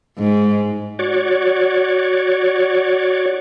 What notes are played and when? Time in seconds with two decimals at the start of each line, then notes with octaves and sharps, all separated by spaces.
0.18 G#2
0.99 F#4 C#5 D5